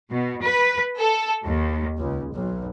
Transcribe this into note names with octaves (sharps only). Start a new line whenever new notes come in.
B2
B4
A4
D#2
C#2
B1